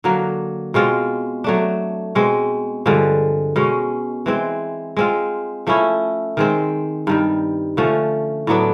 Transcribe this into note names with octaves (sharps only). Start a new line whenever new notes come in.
D3 F#3 A#3
B2 G#3 C4 F4
F#3 A3 D4
B2 G#3 C4
G2 D3 F3 G#3
B2 G#3 C#4
E3 G#3 C4
G#3 C4 F4
F3 A3 C#4 E4
D#3 G#3 C4
G2 D#3 G3
D3 F3 A3 C#4
A2 F#3 B3 D4